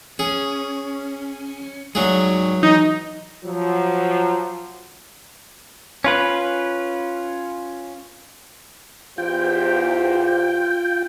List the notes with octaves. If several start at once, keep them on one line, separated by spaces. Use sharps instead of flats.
C#4 G#4
F#3 G#3 D#4 G#4 D5
E3 D#4
F3 F#3
C#4 F4 B4
E2 F4 G4 C5 G5